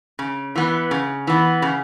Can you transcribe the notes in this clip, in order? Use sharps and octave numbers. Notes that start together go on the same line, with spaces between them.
C#3
E3 B3
C#3
E3 B3
C#3